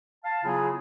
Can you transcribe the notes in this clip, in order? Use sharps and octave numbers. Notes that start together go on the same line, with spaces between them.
F5 A5
C#3 F#3 B3 E4 F4 G#4